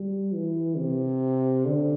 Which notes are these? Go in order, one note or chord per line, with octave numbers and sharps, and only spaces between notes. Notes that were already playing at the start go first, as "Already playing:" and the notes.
Already playing: G3
E3
C3
D3